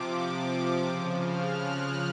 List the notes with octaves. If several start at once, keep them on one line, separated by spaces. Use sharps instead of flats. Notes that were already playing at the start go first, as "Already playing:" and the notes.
Already playing: C3 F3 D6
C#3 F3 D#6
F6
F#6
F#6